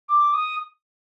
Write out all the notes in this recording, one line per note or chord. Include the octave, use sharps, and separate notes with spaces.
D6
D#6